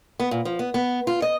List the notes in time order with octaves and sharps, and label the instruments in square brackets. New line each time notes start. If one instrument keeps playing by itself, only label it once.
[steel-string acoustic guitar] B3
A#2
F3
B3
B3
F4
D#5